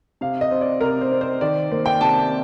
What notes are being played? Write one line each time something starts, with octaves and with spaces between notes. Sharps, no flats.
C3 F5
D#5
C4
D5
C3 A#4
C5
C4
C5
D#3 D5
A#3 C5
G5
C3 A5